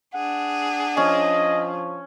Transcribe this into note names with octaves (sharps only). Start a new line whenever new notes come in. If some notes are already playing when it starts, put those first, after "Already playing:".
D4 G#4 F#5
F3 C#4 D#5